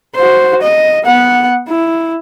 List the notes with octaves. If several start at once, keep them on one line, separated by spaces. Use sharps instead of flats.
F#4 C5
D#5
B3 F#5
E4